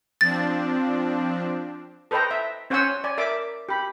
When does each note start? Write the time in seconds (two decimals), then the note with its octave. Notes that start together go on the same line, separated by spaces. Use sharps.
0.21 F3 C4 D4 A6
2.11 A4 B4 C5 D#5 G5 A#5
2.31 E5
2.70 C#4 C5 C#5 F#5 G#5 E6
3.04 D5 G#5
3.18 A#4 D5 E5 D6
3.69 G4 B5